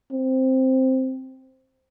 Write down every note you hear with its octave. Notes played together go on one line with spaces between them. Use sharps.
C4